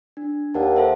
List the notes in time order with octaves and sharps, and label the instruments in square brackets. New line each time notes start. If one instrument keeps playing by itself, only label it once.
[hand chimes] D4
[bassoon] D#2 [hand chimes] D5 F#5 A5
[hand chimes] A4 C5 E5